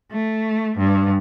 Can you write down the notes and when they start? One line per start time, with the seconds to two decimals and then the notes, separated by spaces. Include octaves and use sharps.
0.11 A3
0.78 G2